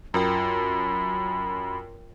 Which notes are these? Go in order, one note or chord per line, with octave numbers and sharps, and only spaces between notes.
F#2 F4 A#4 G5 B5